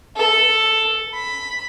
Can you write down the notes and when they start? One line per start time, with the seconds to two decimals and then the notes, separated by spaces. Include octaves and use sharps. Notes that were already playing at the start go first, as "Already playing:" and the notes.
0.17 A4
1.14 B5